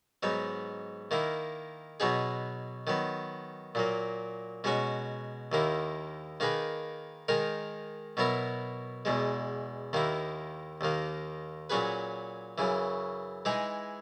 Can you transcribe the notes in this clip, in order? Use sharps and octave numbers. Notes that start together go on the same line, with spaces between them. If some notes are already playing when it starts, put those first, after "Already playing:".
G#2 F#3 B3 D#4
D#3 A#3 E4
B2 F#3 B3 D#4 G#4
D#3 F#3 B3
A#2 F#3 A#3
B2 G#3 C#4 F#4
D#2 D#3 A#3 E4
D#3 A#3 D#4 G#4 B4
D#3 G#3 D#4 A#4
B2 F#3 B3 E4 A#4
E2 B2 G#3
D#2 D#3 A#3 E4
D#2 D#3 A#3
A#2 F#3 C#4 G#4 B4
F#2 C#3 E3
E3 G#3 D#4 G#4